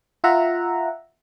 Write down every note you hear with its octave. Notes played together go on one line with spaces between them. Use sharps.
F4 E5 F#5 A#5